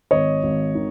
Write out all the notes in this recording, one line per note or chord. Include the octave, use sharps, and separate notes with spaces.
G#1 C#5 D#5
G#1
D#3